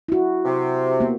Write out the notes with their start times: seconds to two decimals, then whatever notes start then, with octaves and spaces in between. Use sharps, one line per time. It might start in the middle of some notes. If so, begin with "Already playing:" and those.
0.09 E4 F#4
0.45 C3
1.00 A#3 B3